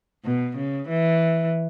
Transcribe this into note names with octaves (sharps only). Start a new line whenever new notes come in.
B2
C#3
E3